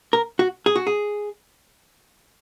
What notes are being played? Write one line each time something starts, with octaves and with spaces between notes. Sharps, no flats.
A#4
F#4
G#4
F#4
G#4